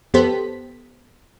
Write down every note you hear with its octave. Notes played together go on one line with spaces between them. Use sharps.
F2 B3 G4 A4 C5 B6